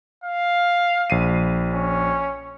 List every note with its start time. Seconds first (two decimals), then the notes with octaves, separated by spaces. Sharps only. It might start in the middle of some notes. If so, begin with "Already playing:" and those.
0.24 F5
1.10 A#1 C7 D#7
1.73 C#4